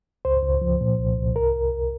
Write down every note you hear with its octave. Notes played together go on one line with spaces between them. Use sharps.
C#2 C5
C#2
F3
A#2
C2
C2
A#4